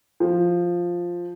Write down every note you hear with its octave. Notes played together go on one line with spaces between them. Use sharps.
F3